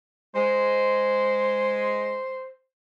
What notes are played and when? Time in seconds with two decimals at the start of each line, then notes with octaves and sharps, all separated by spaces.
0.35 G#3 C5